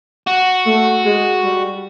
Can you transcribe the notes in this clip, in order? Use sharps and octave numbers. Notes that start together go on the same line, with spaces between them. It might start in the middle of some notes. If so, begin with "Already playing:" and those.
F#4
A3
G#3
G3